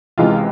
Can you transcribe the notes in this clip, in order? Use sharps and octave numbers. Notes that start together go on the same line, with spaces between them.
C#2 C3 E3 G#3 F4